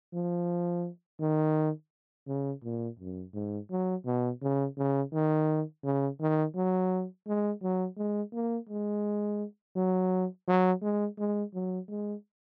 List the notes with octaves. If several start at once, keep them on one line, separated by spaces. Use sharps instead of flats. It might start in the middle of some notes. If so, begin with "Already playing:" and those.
F3
D#3
C#3
A#2
F#2
G#2
F#3
B2
C#3
C#3
D#3
C#3
D#3
F#3
G#3
F#3
G#3
A#3
G#3
F#3
F#3
G#3
G#3
F#3
G#3